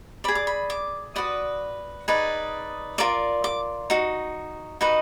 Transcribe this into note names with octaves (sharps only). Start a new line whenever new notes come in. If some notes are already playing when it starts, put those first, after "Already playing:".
G#4 D5 B5
D6
B5
D6
F#4 B4 D5 D#6
D#4 G#4 B4 D5
F4 A#4 D5 D6
D6
D#4 F#4
D#4 F#4 B4 D#5